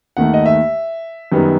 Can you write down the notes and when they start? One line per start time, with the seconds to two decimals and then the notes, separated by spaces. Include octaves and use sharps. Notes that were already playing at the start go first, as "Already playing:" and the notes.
0.17 D#2 D#3 A3 F#5
0.34 D#5
0.46 E5
1.32 F#2 D#3 G3 B3